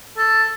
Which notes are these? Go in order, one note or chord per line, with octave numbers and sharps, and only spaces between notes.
A4